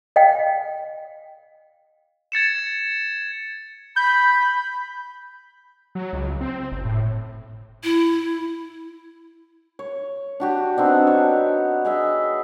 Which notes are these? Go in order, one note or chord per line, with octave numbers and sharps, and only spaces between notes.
D#5 F5 G5
G#6 A6 C#7 E7
B5 G6
F#3
C#2
C4
F#1
A2
E4
C#5
D4 F#4 G4
B3 C4 D4 D#4
C#5
G#4 D#5 E5